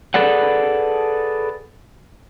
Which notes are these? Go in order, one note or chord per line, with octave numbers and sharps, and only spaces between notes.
G#4 A4 B4 D5 F#5